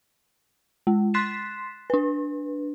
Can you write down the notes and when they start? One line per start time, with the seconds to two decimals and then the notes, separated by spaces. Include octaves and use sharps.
0.87 G#3
1.14 C6 F#6 A6 B6 C7 E7
1.90 D4 B4